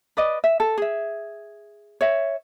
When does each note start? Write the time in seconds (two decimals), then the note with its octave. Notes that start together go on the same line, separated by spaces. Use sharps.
0.17 B4 D5 D#5
0.44 E5
0.60 A4
0.78 G#4 E5
2.01 C#5 E5